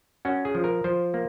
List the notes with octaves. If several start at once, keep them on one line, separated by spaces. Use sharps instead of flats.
C#4 F#4
G#4
F3
A#4
F3 C5
A#3